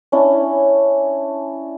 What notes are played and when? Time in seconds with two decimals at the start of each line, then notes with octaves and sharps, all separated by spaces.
0.12 C#4 D4 E4